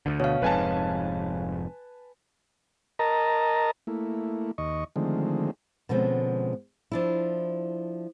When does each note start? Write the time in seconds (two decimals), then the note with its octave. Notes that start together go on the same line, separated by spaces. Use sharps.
0.06 D2 D3
0.20 B2 C#5 F5
0.42 F1 F2 G#2 B4 G#5 A5
2.99 A#4 D#5 A5 A#5
3.87 A3 A#3 E4
4.58 D#2 D#5 C#6
4.96 D3 D#3 F3 G#3 A3 C4
5.89 B2 D3 F3 G#3 C4 C#4
6.92 F3 D4 E4